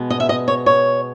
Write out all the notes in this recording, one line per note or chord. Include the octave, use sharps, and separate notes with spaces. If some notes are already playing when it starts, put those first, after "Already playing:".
Already playing: B2 G#3 B3
D#5
E5
D#5
C#5
C#5